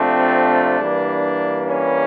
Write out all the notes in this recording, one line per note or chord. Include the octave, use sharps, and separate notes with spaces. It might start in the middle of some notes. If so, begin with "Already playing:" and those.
Already playing: F2 C3 F3 A3 C4 D4
G2 E3 G3 A#3
C#4